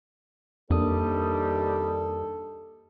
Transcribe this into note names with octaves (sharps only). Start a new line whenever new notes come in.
F2 C3 D#3 G3 A#3 D4 A4 D#6